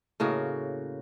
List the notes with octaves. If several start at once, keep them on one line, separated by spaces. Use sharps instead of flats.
A2 C#3 A#3 F#4